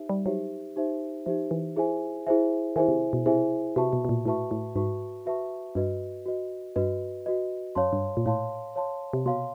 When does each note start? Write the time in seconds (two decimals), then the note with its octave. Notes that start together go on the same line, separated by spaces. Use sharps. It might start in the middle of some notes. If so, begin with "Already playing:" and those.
Already playing: D#4 G4 C5 E5
0.09 G3
0.26 F#3 D#4 G4 C5 E5
0.76 D#4 G4 C5 E5
1.26 F3 D#4 G4 C5 E5
1.51 E3
1.76 E4 G#4 C5 E5 G#5
2.27 E4 G#4 C5 E5 G#5
2.76 D#3 E4 G#4 C5 E5 G#5
2.88 C3
3.13 B2
3.26 C3 E4 G#4 C5 E5 G#5
3.76 C3 F#4 B4 E5 A5 C#6
3.93 B2
4.05 B2
4.09 A#2
4.25 A2 F#4 B4 E5 A5 C#6
4.51 A2
4.76 G#2 F#4 B4 E5 A5 C#6
5.26 F#4 B4 E5 A5 C#6
5.75 G2 F#4 B4 D#5
6.26 F#4 B4 D#5
6.76 G2 F#4 B4 D#5
7.26 F#4 B4 D#5
7.75 F#2 C#5 F5 A5 C6
7.93 G2
8.17 A#2
8.26 A2 C#5 F5 A5 C6
8.76 C#5 F5 A5 C6
9.13 C3
9.26 B2 C#5 F5 A5 C6